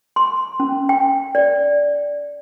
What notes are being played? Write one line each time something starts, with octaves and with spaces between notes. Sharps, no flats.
C6
C#4
G5
D5